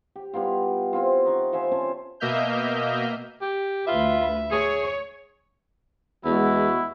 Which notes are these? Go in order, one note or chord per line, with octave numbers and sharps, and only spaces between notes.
G4
G3 B3 E4 F4
C4 E4 F4
D#4 D5 F#5 C#6
F4 C5 E5 G#5
C4 C#4 C5 A5
B2 A#3 D#5 E5 F6 G6
G4
D2 F4 B4 E5
G#4 C#5
E2 G#3 E4 F#4